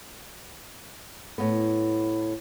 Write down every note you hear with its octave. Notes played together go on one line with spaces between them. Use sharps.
A2 B3